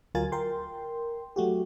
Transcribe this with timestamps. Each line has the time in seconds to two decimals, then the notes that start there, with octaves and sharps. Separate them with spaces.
0.15 D2 F#3 F4 A#4 G#5 A6
0.32 A#4 G5 C6
1.36 F#3 A3 F#4 G4